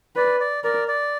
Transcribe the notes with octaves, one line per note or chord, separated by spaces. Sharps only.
B4 D5
D5
A#4 D5
D5